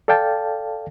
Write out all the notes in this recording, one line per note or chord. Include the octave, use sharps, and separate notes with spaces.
A4 D5 F5 G5 A5